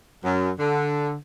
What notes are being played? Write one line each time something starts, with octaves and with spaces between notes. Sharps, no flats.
F#2
D3